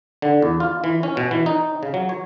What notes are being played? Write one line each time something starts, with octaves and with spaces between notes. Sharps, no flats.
D3
E2
F4
E3
C#4
B2
E3
D#4
C#3
F#3
C#5